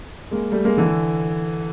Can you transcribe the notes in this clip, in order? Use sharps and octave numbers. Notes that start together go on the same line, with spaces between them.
G#3 A#3
G3 A3
G#3 A#3
D3 E3